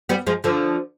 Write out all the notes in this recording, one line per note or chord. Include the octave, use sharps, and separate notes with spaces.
G3 B3
F3 G#3
D3 F3